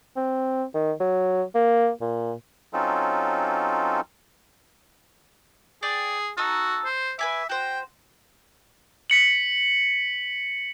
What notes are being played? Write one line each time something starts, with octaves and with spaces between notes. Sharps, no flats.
C4
D#3
F#3
A#3
A#2
F#3 C4 C#4 D#4 F4 A4
G#4 D5 G5
D#4 F#4 A4
C5
B4 E5 G#5 D6
F#4 C5 G5
B6 C#7 F#7